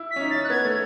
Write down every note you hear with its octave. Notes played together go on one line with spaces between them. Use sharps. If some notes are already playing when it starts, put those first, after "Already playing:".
Already playing: E4
B6
C#4
D#4
C#4 A6
F#6
B3 G#6
A3